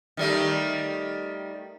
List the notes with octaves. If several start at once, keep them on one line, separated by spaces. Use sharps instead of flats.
D#3 G3 A3